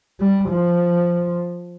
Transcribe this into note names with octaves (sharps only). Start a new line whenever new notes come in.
G3
F3